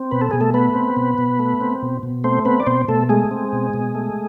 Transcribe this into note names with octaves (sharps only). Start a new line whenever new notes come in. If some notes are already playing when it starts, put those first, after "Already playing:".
Already playing: C4
B2 B4
A4
B2 G#4
A3 A4
A3 B3 B4
C4
B2
B2
A3
C4
B2
B2
A3 C4 C5
B3 C4 B4
D5
B2 C4 C5
B2 A3 A4
G#3 A3 G#4
C4
B2
B2
A3